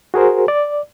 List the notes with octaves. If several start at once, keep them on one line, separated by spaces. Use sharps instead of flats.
F#4 G#4 A#4 C5
D5